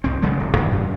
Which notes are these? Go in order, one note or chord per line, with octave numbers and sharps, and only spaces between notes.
C2 C4
C#3 F#3 G#3 A3
D1
F#2 A#2 D#3 E3
F#2